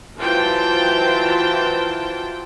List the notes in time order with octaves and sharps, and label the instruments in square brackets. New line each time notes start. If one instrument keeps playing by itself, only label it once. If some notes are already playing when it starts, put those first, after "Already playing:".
[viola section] E3 F#3 F4 C5 G5 A5